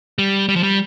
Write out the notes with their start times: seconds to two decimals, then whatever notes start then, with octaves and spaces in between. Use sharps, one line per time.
0.18 G3
0.49 G3
0.56 F3
0.63 G3